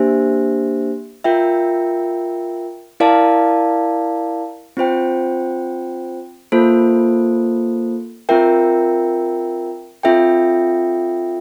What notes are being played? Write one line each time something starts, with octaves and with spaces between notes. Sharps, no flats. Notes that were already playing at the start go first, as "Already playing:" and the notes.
Already playing: A#3 D4 G4 C5 E5
F4 A#4 E5 G5
E4 A#4 D5 F5 A5
C4 F4 C5 G5
A#3 F4 A4 C5
C4 F4 A#4 E5 G5
C4 F4 A4 E5 G5